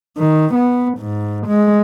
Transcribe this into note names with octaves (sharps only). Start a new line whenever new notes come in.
D#3
B3
G#2
G#3